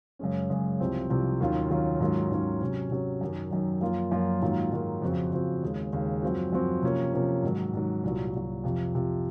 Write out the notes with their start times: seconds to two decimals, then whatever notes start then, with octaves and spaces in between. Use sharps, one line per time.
0.19 F#2 C#3 G#3 C#4
0.49 F#2 C#3 G#3 C#4
0.80 C2 C3 F3 C4
1.10 C2 C3 F3 C4
1.40 D#2 D#3 F#3 C#4 F4
1.70 D#2 D#3 F#3 C#4 F4
2.00 G#2 D#3 F#3 C#4 F4
2.31 G#2 D#3 F#3 C#4 F4
2.61 C3 F#3 C#4
2.90 C3 F#3 C#4
3.21 F#2 D#3 F#3
3.51 F#2 D#3 F#3
3.81 F#2 F3 A#3 F4
4.11 F#2 F3 A#3 F4
4.42 G#2 D#3 F#3 A#3 F4
4.72 G#2 D#3 F#3 A#3 F4
5.02 F2 C#3 F3 C4 F#4
5.32 F2 C#3 F3 C4 F#4
5.62 D#2 C#3 G#3
5.93 D#2 C#3 G#3
6.23 F#2 F3 C4 F#4
6.53 F#2 F3 C4 F#4
6.82 C3 F3 A#3 C#4
7.13 C3 F3 A#3 C#4
7.43 G#2 D#3 F#3
7.74 G#2 D#3 F#3
8.03 C2 A#2 F#3
8.34 C2 A#2 F#3
8.64 F2 C3 F3
8.94 F2 C3 F3